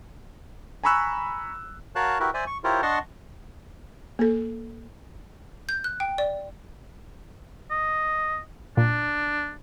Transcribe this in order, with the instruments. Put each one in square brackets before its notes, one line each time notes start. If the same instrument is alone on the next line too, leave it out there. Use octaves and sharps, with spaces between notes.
[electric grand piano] G#5 A#5 B5 C#6 E6 F#6
[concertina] F#4 A#4 C#5 F5 A5 F#6
E4 F#4 G4 A#4 B4 E5
C5 D5 E5 G#5
C#6
E4 F4 G4 A#4 C5 C#5
D4 D#5 F#5 A5 C6 C#6
[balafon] A#3 A4
[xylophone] G6
F#6
G5
D5
[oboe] D#5
[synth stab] A#2 [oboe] D4